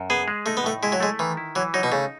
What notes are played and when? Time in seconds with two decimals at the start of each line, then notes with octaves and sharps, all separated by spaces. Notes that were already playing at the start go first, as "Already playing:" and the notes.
Already playing: F#2
0.10 B3 G#4
0.28 G#3
0.46 A3 D#4
0.57 B3
0.64 A2 A3
0.83 G#3 E4
0.92 F#3
1.00 G#3 A3
1.19 D#3 E3
1.37 E4
1.56 E3 F#3
1.74 F#3 D#4
1.83 B2
1.92 C#3 A3